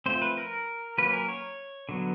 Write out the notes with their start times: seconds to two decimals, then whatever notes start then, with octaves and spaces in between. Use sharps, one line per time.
0.06 F3 A3 C4 C5
0.22 B4
0.37 A#4
0.98 F#3 A#3 C#4 B4
1.13 A#4
1.29 C#5
1.89 D3 F#3 B3